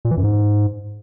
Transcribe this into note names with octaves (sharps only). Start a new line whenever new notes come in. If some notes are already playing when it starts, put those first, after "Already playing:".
A#2
E3
F#2
G#2